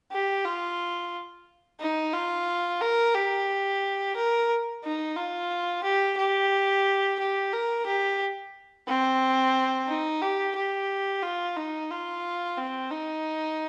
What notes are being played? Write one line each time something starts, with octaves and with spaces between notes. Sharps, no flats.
G4
F4
D#4
F4
A#4
G4
A#4
D#4
F4
G4
G4
G4
A#4
G4
C4
D#4
G4
G4
F4
D#4
F4
C4
D#4